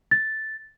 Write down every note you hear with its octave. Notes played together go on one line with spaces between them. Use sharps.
A6